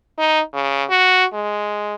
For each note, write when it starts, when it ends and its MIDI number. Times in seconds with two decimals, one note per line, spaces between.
0.19 0.41 63
0.54 0.84 49
0.90 1.24 66
1.33 1.95 56